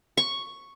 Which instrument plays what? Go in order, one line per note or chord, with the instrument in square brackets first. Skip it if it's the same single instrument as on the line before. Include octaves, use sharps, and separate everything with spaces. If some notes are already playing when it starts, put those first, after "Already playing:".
[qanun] C#6